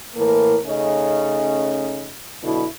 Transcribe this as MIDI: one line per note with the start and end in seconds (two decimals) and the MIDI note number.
0.15 0.57 45
0.15 0.57 52
0.15 0.57 58
0.15 0.57 70
0.66 2.12 49
0.66 2.12 57
0.66 2.12 61
0.66 2.12 63
0.66 2.12 75
2.42 2.64 47
2.42 2.64 50
2.42 2.64 54
2.42 2.64 64